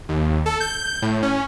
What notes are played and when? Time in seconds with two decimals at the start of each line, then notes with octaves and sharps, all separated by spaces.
0.09 D#2
0.46 A4
0.60 G6
1.02 A2
1.22 C#4